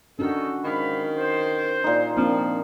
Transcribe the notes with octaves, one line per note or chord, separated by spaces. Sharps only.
D#3 C#4 D4 F#4 A4
G#2 D#3 F5 B5
C5
A#2 D#4
F3 A#3 C4 D4